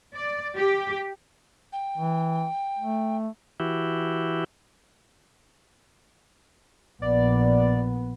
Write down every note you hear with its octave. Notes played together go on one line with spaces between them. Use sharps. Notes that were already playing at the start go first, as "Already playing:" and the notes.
D5
G4
G5
E3
A3
E3 E4 F#4 G4
A#1 B3 D5